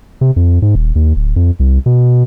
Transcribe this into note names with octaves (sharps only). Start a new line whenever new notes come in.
C3
F2
G#2
D#1
D#2
D1
F2
C2
B2